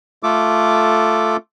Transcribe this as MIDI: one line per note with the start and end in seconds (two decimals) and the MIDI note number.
0.23 1.37 57
0.23 1.37 65
0.23 1.37 69
0.23 1.37 86